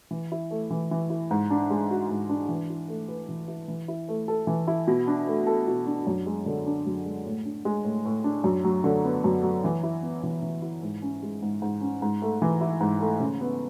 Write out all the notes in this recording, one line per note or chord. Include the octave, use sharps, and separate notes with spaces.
E3
E4
A3
E3
E3
E4
G#2
D4
G#3
F#4
G#2
D4
E3
E4
A3
B4
E3
E4
E3
E4
A3
A4
E3
E4
B2
D4
A3
A4
B2
D4
F#2
G#3
D3
D4
F#2
G#3
A2
D4
G#3
A2
A2
D4
F#2
F#3
D3
B3
F#2
F#3
E3
E4
B3
E3
E3
E4
G#2
C#4
G#3
G#2
G#2
C#4
G#2
A3
E3
E4
G#2
A3
C#3
B3